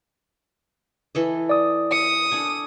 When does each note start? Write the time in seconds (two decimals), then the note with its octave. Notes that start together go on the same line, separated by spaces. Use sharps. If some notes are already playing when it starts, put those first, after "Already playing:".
1.15 E3 A4 D#5
1.49 D5 D#6
1.92 E5 D#6 C#7
2.32 D4 A4 G#5